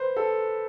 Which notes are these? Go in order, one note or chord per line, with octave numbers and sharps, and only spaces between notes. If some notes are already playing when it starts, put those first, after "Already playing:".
Already playing: B4 C5
A4